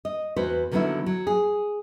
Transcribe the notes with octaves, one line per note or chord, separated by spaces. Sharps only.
D#5
E2 F#4 B4 C5
D3 D#3 F#3 B3 C#4 E4
F#3
G#4